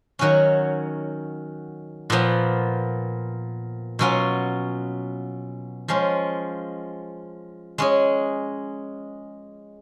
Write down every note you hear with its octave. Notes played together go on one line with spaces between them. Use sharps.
D#3 F#3 C#4 F#4 C#5
A#2 F3 B3
B2 F#3 C#4 F4
F3 G#3 C#4 F4
G#3 C#4 G#4